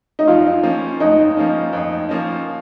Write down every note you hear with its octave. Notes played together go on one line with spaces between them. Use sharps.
D#4
F2 F4
F3 A#3 C#4
F2 D#4
F3 A#3 C#4
F2
F3 A#3 C#4